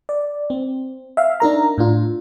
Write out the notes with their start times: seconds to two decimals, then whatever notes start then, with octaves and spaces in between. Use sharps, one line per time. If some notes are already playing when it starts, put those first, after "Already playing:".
0.09 D5
0.50 C4
1.17 E5 F5
1.40 D4 D#4 A#4 A#5
1.78 A2 D4 F4